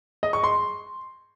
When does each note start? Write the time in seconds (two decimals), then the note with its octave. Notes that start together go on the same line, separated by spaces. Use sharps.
0.23 D#5
0.33 C#6
0.44 C6